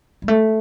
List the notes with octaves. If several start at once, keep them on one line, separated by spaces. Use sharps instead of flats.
G3
A3